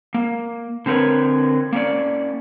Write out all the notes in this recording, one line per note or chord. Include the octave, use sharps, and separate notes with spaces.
A#3
D3 C4 A#4 B4 C#5
A#3 C#4 D5